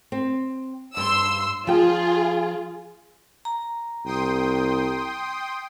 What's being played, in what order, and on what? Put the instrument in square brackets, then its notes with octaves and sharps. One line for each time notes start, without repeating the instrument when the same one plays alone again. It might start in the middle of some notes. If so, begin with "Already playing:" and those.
[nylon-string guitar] C4
[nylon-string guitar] G2 [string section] C6 E6
[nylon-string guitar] F3 G5 [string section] F4 G#4
[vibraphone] A#5
[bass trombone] C2 [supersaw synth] G5 C6 D#6